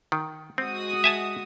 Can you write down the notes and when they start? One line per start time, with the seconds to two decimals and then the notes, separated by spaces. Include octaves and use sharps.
0.12 D#3
0.58 G#3 C4 F#4 D#6
1.04 E5 G#5 A5